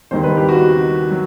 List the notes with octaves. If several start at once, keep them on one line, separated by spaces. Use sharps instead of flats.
D#2 D#3 G3 C5
B4
G4
F#4
F#3